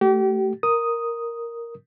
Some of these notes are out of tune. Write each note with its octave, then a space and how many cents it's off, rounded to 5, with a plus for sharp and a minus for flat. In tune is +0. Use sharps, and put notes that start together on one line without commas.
A3 +0 G4 -35
A#4 +0 D#6 +0